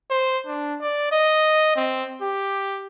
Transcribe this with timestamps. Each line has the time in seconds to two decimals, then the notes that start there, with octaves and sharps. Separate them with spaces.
0.10 C5
0.46 D4
0.81 D5
1.12 D#5
1.76 C4
2.22 G4